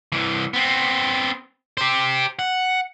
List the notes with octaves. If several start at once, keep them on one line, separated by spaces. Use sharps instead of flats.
C2 E3
B3 C4
G4 C5
F#5